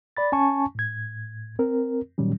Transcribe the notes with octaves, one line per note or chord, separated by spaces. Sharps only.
D5 B5 A6
C#4 G#5 A5 C#6
A2 G#6
C4 A#4
A#2 D#3 F#3 G3 C#4